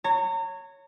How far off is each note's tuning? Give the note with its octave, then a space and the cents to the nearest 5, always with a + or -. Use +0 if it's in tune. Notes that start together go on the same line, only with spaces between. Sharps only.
C#5 +0 A#5 -35